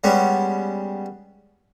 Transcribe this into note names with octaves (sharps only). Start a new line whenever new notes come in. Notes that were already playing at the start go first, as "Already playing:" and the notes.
G3 G#3 B3 C#4